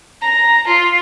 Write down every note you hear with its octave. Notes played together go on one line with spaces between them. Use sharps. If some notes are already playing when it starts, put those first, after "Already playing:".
A#5
F4